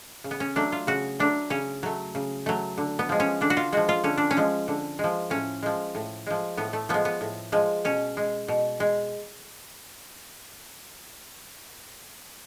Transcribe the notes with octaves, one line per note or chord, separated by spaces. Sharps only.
C#3
B3
C#4
F#3 A3 D4
F4
C#3 F#4
F#3 A3 D4
C#3 C#4
F#3 A3
C#3
F#3 A3
D3
B3
F3 G#3
C#4
D3 D4
F#4
F4
F3 G#3 F#4
F4
D3 C#4
D4
C#4
F3 G#3
D3
F3 G#3
A2 C#4
F3 G#3
A2
F3 G#3
A2 B3
A3
F3 G#3 B3
B3
A2
F3 G#3
B2 C#4
G#3
B2
G#3